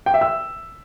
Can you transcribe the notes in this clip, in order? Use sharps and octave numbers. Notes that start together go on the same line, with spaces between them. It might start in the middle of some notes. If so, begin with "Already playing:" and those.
G5
E5
E6